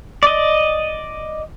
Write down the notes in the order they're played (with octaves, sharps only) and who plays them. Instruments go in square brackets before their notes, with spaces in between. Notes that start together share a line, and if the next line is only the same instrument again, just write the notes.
[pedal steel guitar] D5 D#5